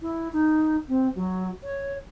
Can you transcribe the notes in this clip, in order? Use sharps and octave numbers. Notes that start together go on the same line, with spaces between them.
E4
D#4
C4
F#3
C#5